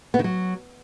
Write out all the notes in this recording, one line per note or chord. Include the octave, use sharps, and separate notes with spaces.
B3
D#3
F#3